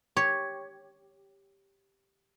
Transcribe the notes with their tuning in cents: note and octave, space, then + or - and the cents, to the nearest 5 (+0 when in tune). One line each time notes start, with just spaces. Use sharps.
G4 +0 C#5 +0